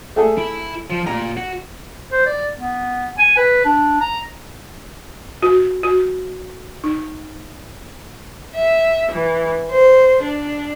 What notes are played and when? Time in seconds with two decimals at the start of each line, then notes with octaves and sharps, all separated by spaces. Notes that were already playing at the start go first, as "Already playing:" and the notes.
0.16 A3 G#4 A4
0.37 E4 B5
0.90 F3
1.06 A#2 A#5
1.37 F#4
2.12 C5
2.26 D5
2.56 B3
3.18 G#5
3.37 B4
3.65 D4
4.01 A#5
5.43 F#4
5.83 F#4
6.84 D#4
8.54 E5
9.11 E3
9.70 C5
10.21 D4